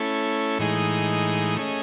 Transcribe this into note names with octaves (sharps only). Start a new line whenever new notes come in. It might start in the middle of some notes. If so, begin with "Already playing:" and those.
Already playing: A3 C#4 E4 A4
A2 E3 G#3 D#4 G#4
A3 C#4 G#4 D#5